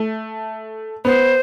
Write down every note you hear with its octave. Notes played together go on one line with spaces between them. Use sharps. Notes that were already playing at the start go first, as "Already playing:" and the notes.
Already playing: A3
B3 C5